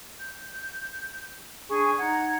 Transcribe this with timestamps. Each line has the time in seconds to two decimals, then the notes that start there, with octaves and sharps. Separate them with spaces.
0.20 G6
1.69 D4 G#4 G#5 C#6
1.99 D#4 F#5 A#5 G#6